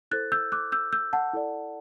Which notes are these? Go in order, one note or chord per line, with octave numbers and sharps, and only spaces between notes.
E4 A4 C5 F#6 A6
E6 G6
D6 F#6
E6 G6
E6 G6
F#5 A5
E4 A4 D5